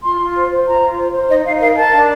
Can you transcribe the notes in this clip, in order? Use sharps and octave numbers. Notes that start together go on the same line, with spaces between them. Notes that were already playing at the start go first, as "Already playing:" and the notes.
F4 C6
F4
C5
C5
F4 A#5
F4
C5
C5
D#4 D#5
D#4 F5
A#4 F5
A#4 A5
D4